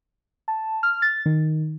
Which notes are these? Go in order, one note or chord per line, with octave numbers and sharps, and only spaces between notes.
A5
F6
A6
D#3